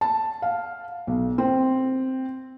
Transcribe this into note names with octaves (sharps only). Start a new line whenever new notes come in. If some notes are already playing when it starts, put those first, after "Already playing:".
A5
F5
B1
C4